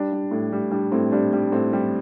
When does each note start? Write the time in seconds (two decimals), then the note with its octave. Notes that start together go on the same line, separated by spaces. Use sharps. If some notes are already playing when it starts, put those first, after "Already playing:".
Already playing: G3 D4
0.12 G3
0.31 A2
0.53 G3
0.71 G3 D4
0.92 A2 C4
1.12 G3 D4
1.33 G3
1.52 A2 C4
1.73 G3